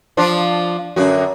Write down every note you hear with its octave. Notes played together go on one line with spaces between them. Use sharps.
F3 D4 F4
F#2 D3 F#4